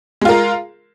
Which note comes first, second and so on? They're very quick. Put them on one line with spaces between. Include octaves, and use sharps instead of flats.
G#3 F4 A#4